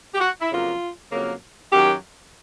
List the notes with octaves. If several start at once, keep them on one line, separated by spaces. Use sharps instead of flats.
G4
F#4
E4
F2 C#3 F#3 A#3 F4
F2 C#3 F#3 A#3
F#2 D#3 F#3 G4